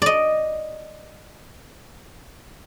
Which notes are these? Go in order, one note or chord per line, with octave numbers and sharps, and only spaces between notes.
D5 D#5